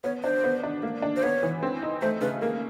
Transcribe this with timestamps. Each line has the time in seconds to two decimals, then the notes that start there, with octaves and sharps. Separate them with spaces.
0.04 B3 C#5
0.23 D4 C5
0.44 B3
0.63 D4
0.83 A#3
1.02 D4
1.16 C5
1.23 B3 C#5
1.43 E3
1.63 C4
1.82 D#4
2.01 A3 C5
2.21 C#3 B4
2.42 A#3 A#4